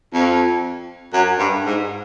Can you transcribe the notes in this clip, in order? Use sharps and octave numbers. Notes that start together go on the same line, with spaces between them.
F2
F#2
G2
G#2